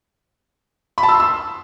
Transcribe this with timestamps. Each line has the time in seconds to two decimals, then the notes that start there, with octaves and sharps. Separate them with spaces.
0.98 B5
1.03 A5
1.09 E6
1.14 C6
1.20 E6